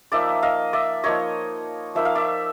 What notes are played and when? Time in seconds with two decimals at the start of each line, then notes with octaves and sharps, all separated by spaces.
0.12 F3 A#3 D#4 D5 E5
0.42 D#5 F5
0.73 D5 E5
1.04 F3 A#3 D#4 C#5 D#5
1.95 F3 A#3 D#4 E5
2.05 F5
2.15 D5 E5